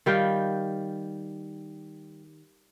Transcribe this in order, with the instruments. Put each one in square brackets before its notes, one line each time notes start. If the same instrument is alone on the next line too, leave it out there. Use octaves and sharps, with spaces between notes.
[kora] D#3 G3 F5 G5